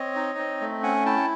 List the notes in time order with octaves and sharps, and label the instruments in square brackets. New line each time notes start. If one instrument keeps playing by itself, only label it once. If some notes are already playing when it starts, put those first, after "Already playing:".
Already playing: [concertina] C4 C#5 D#5
D#4
C4
A3
C#4 F#5 G#5
E4 G5 A5